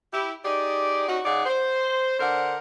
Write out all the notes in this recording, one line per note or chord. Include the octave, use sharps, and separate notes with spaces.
E4 G4
D#4 G4 G#4 D5
C#4 D#4 F#4
C#3 D#4 G#4 D5 F#5
C5
D3 D4 A#4 C5 F#5